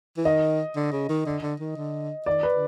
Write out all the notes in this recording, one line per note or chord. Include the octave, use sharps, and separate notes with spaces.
E3
D#3 D#5
D3
C#3
D#3
D3
D3
D#3
D3
D#3 D5
B4
D3